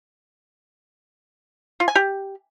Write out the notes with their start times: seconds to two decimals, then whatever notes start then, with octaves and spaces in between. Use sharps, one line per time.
1.80 F4
1.88 G#5
1.95 G4